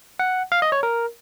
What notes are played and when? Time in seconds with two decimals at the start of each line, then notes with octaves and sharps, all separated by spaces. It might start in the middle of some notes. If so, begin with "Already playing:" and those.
0.19 F#5
0.52 F5
0.62 D#5
0.72 C#5
0.83 A#4